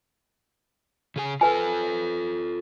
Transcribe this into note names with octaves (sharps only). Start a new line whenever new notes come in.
C#3 G#4 G#5
F4 A4 B4 G#5